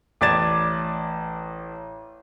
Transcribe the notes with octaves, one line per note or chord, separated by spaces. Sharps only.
A1 D5 D6 G#6 A6 E7